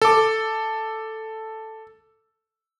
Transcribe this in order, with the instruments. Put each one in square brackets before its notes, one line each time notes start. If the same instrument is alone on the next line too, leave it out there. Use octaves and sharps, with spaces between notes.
[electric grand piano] A4 D6